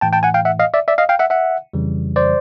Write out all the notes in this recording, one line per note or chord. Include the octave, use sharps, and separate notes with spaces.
A2 E3 A3 G5 A5
G5 A5
F#5 G#5
F5 G5
E5 F#5
D#5 F5
D5 E5
D5 E5
D#5 F5
F5 G5
E5 F#5
E5 F#5
F2 C#3 E3 G3
C5 D5